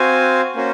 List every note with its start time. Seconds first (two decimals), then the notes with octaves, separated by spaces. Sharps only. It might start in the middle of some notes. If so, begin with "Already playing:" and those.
Already playing: C4 F#4 C5 F5 G#5
0.55 A#3 C#4 F#4 C5